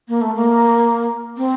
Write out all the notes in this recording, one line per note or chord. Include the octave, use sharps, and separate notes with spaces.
A#3
A3
A#3
C4